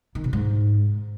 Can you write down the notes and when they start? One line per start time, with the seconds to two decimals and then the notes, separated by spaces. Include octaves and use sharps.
0.15 D#3
0.24 B2
0.33 G#2